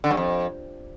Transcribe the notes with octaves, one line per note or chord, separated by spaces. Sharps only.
D3
G2
F2